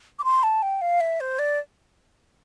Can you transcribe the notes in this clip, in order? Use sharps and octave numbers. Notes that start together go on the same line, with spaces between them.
D6
C6
A5
G5
F5
E5
C5
D5